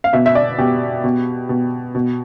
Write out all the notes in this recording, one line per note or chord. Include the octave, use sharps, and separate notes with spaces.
F5
B2 E5
E5
D5
B2 G4
B2
B2
B2